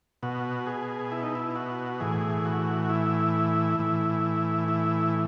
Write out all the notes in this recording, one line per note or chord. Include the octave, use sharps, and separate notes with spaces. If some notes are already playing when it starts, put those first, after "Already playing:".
B2 F#4
G#4
E4
D#4
E4
F#4
A2 E3 G#4
F#4
E4
A2 E3
E4